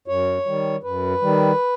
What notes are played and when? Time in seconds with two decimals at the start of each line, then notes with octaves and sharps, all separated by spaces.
0.08 F#2 C#5
0.46 D#3 G3
0.83 F#2 B4
1.22 D#3 G3